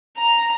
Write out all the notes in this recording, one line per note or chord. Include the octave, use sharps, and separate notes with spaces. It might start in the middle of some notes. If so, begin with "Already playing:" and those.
A#5